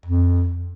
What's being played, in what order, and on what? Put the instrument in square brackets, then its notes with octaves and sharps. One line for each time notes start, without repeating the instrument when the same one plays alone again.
[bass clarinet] F2